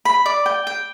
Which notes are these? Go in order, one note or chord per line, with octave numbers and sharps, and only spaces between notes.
B5
D5
G5
G5